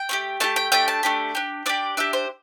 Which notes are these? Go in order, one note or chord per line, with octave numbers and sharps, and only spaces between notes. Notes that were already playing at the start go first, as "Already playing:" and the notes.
Already playing: G5
A3 D4 G4
A3 D4 G4 A5
G5
A3 D4 G4 G5
A5
A3 D4 G4
D4 G4
D4 G4 D5
D4 G4 E5
C5